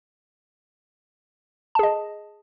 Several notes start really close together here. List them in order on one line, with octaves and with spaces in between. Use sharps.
A5 G#4 D#5